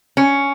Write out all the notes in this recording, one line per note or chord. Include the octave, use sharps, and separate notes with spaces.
C#4